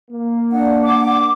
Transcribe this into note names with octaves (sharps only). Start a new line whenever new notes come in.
A#3
D4 F#5
D6